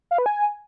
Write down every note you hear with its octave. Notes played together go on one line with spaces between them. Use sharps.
F5
B4
G#5